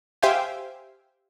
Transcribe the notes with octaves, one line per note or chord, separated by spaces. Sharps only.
G4 C5 E5 F5 G5 G#5